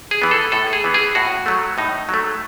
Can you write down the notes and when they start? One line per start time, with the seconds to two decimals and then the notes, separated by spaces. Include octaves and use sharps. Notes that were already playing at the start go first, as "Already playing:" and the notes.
0.11 G#4
0.22 E3 B3
0.31 A4
0.52 A2 A4
0.73 G#4
0.84 E3 B3
0.94 G#4
1.15 A2 F#4
1.46 F#3 A3
1.78 A2 D#4
2.09 F#3 A3